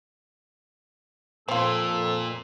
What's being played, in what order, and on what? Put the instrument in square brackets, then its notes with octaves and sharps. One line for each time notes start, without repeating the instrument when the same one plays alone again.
[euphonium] F2 [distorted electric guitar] A#2 [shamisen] C4 F4 [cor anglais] A4